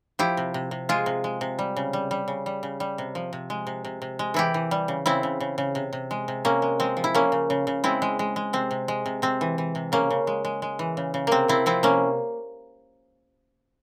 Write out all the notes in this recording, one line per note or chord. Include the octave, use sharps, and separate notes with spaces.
F3 E4 G4
C3
C3
C3
G#3 F4 G#4
C3
G#3
C3
G3
C#3
G3
G3
C#3
G3
C#3
G3
C3
F3
C3
G#3
C3
C3
C3
G#3
E3 E4 G4
E3
G3
C#3
C#3 C4 E4
C#3
C#3
C#3
C3
C3
G#3
C3
C3 A#3 C#4
G#3
G#3 C4
F3
E4
F3 A#3 C#4
C#3
C#3
C#3
G#3 C4 E4
G#3
G#3
G#3
C3 C4
C3
G#3
C3
C3 C4
E3
E3
C3
C#3 A#3 C#4
C#3
G#3
G#3
G#3
E3
C#3
C#3
C3 A#3 C4
C3 C4 E4
F3 C4 E4
C3 A#3 C#4